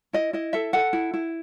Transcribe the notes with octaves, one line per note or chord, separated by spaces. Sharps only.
E4 D#5
E4 D#5
A4 E5
A4 F#5
E4
E4